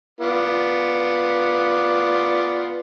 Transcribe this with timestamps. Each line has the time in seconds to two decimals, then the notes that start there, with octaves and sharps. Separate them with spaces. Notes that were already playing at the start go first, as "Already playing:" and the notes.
0.21 B3 F4 D5